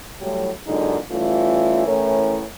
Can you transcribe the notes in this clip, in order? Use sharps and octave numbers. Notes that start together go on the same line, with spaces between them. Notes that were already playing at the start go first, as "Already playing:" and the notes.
A2 F#3 G3
A#2 D3 F#3 G#3 D#4
E3 G3 A3 C#4 F4
A2 E3 A3 C#4 A#4 C#5